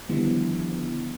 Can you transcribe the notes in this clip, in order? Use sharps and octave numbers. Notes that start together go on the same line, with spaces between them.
D3 D#3 F3 G3 B3 E4